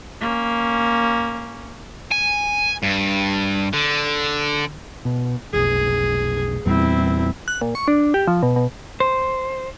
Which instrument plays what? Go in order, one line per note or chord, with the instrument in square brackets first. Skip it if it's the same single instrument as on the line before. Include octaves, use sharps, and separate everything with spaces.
[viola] A#3 C#4
[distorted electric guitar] G#5
G2
D3
[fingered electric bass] B2
[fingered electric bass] F1 B1 [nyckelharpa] G#4
[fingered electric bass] E2 A#2 G3 [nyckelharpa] C4 E4
[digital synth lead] F#6
A#2
C#6
D4
G4
F3
B2
B2
[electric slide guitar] C5